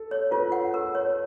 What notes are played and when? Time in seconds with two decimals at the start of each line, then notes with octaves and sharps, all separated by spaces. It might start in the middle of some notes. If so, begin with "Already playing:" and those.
Already playing: A4
0.11 C#5
0.31 F4 B4
0.52 F#5
0.74 A#4
0.95 C#5